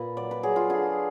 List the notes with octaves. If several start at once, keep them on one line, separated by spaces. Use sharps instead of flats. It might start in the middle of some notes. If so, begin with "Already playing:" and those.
Already playing: A#2 B4
F#3 D5
B4
F#3 G#4
F4
D3 G#4